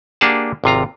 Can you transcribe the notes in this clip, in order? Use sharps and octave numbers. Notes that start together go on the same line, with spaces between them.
A#3 D4 G4 G#4 F#5 A5
G#1 C3 F4 A#5